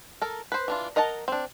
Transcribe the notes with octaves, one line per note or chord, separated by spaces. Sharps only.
A4 A#4
B4 C5
E3 D4 F4
A#4 D#5 F#5 A5 A#5
C4 D4